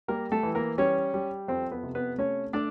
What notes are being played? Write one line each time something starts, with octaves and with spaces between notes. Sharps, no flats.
G3 A#3 A#4
A3 A4
E3
A#3 A#4
G3 C#4 C#5
G3
F2 C4 C5
B3 B4
C3
B3 B4
A3 C#4 C#5
A3 D4 D5